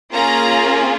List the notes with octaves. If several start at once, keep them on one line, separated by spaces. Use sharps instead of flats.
A#3 C#4 F4 G#4 A#5